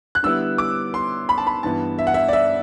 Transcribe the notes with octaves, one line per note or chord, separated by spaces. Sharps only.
F#6
D3 G3 B3 E4 E6
D6
C6
B5
A5
B5
G2 E3 B3 A5
E5
F#5
E5
D5
E5